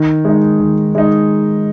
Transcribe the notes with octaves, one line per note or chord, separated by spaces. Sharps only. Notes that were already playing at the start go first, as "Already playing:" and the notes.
Already playing: D#3
G#3 D#4
D#3
G#3 D#4